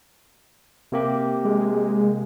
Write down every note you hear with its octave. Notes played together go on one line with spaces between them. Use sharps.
C3 A#3 G4
G#3